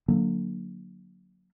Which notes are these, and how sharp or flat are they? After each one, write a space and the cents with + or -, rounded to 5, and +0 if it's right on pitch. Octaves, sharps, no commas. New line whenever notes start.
D3 +5 F#3 -15 A#3 +0